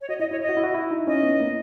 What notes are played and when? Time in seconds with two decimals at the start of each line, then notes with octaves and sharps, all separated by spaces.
0.01 C#5
0.09 F#4 D#5
0.20 E4 D#5
0.31 E4 C#5
0.42 D#5
0.49 F#4
0.57 E4
0.64 F#4
0.75 E4
0.91 D#4
1.07 C#4 D#5
1.23 B3
1.40 A#3